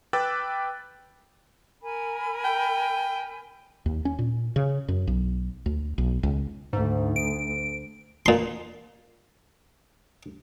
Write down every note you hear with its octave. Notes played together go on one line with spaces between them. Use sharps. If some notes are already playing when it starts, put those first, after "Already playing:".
B4 G5 D6 E6 F#6 A6
A#4 G#5 B5
G5
D#2
C#4
A#2
C#3
F#2
B1
D2
B1
C#2
D2 G#2
D7
A#2 C6